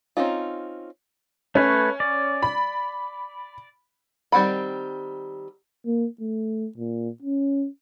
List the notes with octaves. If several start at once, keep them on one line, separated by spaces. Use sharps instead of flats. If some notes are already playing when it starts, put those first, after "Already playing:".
C4 C#4 D#4 F4
A3 C#4 B4 C#5
D5
B5
D#3 G3 C4 F#5 B5
A#3
A3
A#2
C#4